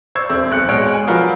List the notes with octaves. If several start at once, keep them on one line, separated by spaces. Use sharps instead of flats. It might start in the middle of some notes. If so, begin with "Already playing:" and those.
C5 D5 C#6 E6 G#6
E1 C4
B1 F#6 C#7
B2 G#3 C#5 F6 D7
G#5
F3 F#3 F4 F#4 A#4 B4